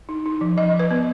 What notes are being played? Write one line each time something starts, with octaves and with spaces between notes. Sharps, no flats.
D#4
D#4
F3
F3 D#5
F3
B4
B3